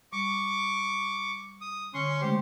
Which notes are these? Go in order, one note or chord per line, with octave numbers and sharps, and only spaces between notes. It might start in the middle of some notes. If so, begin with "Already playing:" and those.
G3 C#6 D6
D#6
D3 C#4 C6 C#6
C#3 G#3 A3 G4 C5